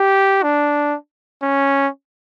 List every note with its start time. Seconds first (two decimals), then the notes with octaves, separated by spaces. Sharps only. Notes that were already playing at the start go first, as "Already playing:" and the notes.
Already playing: G4
0.43 D4
1.43 C#4